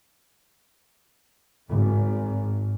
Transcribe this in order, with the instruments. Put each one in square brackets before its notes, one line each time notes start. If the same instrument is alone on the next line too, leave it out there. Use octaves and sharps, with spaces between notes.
[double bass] G#1 G#2